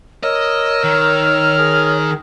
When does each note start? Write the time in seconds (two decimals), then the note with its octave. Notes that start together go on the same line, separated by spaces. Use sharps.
0.23 A#4 C#5 D#5 E6
0.84 D#3 F6
1.58 G#4 A#4